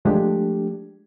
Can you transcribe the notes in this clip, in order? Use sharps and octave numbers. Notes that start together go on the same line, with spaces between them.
F3 G#3 A3 D4 G4